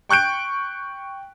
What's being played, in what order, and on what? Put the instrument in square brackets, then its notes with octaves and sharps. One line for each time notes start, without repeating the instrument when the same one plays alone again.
[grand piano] G5 C#6 F#6 G6 D7